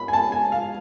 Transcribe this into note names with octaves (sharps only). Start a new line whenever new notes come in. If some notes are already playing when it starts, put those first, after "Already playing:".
Already playing: B5
G#5
A5
G#5
F5